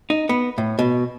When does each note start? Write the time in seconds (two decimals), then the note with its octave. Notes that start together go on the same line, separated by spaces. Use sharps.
0.10 D#4
0.29 B3
0.58 A2
0.79 B2